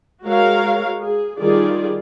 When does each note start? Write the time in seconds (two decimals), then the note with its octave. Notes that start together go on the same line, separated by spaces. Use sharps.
0.24 G#3 F#4 A#4 C#5 F5
1.04 G#4
1.40 D#3 G3 F4 G#4 D5